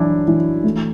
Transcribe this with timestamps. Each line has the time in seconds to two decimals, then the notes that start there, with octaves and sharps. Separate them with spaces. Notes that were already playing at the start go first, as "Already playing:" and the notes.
Already playing: F#2 E3 D4 E4
0.28 E3
0.64 A3